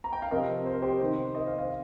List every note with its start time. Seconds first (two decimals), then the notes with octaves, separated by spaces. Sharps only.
0.04 A#5
0.13 G5
0.22 F5
0.31 C3 F3 C4 A#4 D#5
0.66 C5
0.74 A#4
0.82 G4 C5
1.00 C3 D#3 C4 D#4 G4 C5
1.35 A#4 D#5
1.47 C5 F5
1.58 C5 F5